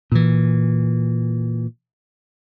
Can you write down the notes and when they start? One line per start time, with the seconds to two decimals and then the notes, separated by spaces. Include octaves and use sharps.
0.12 A#2 E3